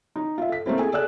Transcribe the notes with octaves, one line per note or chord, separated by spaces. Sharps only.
D#4
F4 E5
A4 B6
A3 A#3 C4 E4
G#4 A4 G#5
G#4 A4 D5 E6 F#6